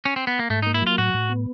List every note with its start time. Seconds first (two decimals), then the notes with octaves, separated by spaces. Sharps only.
0.05 C#4
0.16 C4
0.27 B3
0.39 A#3
0.50 G#2 A3
0.62 D#4
0.67 A#3
0.74 E4
0.82 F#3 F4
0.98 A2 F#4
1.14 A2
1.30 B3